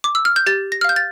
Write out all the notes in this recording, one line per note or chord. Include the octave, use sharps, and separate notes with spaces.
D6
E6
F6
G6
G4 A6
A#6
F6
F5 G6
A6